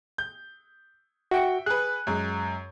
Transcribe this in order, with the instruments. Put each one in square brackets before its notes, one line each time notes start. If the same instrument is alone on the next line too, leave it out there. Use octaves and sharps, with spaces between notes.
[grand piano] G6
[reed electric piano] F#4 [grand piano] E5 G5 C#7
[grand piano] G#4 B4 [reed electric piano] F#6
[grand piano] F#2 G#3